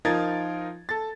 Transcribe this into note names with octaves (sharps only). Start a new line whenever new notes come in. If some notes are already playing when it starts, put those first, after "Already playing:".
F3 D#4 F4 A#4 G#6 A6
A4 A6